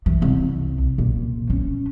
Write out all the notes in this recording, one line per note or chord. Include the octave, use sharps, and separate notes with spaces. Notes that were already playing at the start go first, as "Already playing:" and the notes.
E3
C2
A#2
C#4